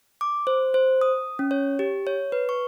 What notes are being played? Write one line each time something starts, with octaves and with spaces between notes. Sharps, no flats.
D6
C5
C5
D#6
C#4
C#5
G4
C#5
B4
C#6